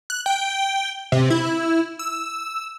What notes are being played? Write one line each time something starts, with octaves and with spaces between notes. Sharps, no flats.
F#6
G5
C3
E4
E6